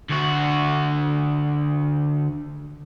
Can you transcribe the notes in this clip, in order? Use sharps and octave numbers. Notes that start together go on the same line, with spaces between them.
D2 F#4